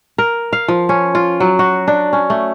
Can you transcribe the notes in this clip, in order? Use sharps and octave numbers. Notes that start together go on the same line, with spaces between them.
A#4
F5
F3
C#4
F4
F#3
F#4
D4
C#4
A3